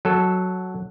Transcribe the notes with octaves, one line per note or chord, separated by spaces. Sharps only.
F#3 A4